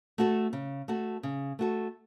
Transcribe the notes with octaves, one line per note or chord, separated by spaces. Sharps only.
A3 F#4 A4
C#3
A3 F#4 A4
C#3
A3 F#4 A4